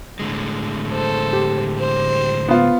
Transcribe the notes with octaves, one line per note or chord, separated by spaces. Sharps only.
A2 D3 G#3
A4 C5
G4
C5
B3 F4